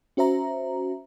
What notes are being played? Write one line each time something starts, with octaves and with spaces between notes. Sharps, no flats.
C#4 F#4 C5 E5 A#5